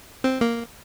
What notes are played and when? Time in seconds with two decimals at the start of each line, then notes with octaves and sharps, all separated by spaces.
0.24 C4
0.41 A#3